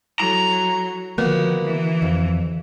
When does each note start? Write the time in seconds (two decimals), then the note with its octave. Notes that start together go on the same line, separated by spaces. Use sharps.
0.20 F#3 E4 A4 A#5
1.18 D3 D#3 F3 A#3 B3 F#4
1.64 E3
2.02 F2